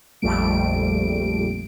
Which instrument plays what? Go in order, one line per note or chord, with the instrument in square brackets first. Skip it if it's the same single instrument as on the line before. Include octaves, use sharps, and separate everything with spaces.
[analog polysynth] A#1 F2 G3 A3 D7